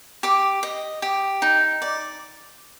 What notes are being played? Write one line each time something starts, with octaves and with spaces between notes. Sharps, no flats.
G4 D6
D#5
G4
D#4
D5